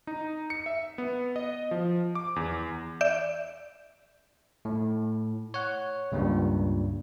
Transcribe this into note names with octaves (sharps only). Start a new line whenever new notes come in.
D#4
C#7
E5
B3
D#5
F3
D6
E2
D5 E5 G6
A2
C#5 F#5
C#2 G2 A#2 G3